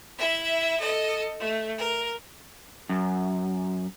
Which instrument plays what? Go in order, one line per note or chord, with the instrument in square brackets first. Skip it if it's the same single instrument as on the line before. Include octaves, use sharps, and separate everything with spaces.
[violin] E4 E5
A4 D#5
A3
A#4
[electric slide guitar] F#2